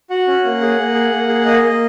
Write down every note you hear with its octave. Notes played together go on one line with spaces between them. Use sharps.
F#4 F#5
C#4
A#3
G#4
A#3
G#4
A#3
G#4
A#3 D#5
A#3